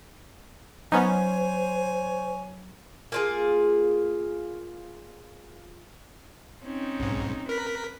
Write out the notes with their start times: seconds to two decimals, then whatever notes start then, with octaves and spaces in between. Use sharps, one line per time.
0.92 F#3 B3 C#4 D#4 C5 C#5 G#5
3.12 A#3 F4 G#4
6.63 C4 C#4 D#4
7.00 B1 G#2
7.49 A#4 B4 B6